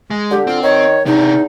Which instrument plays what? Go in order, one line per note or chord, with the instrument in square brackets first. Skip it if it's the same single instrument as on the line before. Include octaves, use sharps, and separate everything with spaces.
[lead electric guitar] G#3
[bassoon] D3 [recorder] G4
[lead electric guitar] C4 [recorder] F4
[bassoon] D#3 [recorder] C#5
[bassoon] E2 [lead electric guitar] C3 D4 [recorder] D#4